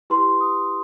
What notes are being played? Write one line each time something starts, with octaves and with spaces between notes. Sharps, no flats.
E4 G4 B4 C6
D#6